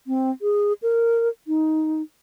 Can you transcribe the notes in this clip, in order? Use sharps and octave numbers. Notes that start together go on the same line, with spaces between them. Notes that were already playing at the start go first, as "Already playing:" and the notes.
C4
G#4
A#4
D#4